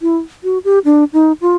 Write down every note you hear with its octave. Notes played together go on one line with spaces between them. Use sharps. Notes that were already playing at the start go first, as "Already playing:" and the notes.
E4
F#4
G4
D4
D#4
F4